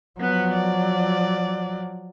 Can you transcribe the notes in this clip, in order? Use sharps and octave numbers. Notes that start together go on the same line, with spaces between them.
F3 F#3 B3 B4
D5